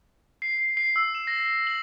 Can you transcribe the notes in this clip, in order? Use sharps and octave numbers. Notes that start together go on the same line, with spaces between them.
C7
C7
C7
E6
E7
A#6
A#6
F#7